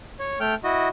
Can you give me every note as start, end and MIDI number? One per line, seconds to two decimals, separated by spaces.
0.19 0.39 73
0.40 0.55 57
0.40 0.55 79
0.40 0.55 89
0.64 0.89 64
0.64 0.89 66
0.64 0.89 75